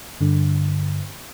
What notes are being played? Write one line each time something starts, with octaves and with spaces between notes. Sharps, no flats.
G2 D3